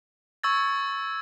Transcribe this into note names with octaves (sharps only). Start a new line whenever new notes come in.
C#6 E6 G#6 A6